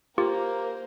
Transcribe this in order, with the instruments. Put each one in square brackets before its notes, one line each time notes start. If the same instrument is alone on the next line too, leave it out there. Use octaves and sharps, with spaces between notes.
[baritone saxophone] A#3 [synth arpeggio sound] F4 [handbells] G4 [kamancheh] A#4 C5